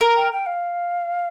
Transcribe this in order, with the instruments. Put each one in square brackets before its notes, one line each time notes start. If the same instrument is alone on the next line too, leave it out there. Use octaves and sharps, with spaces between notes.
[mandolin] A#4
[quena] G5
G5
F5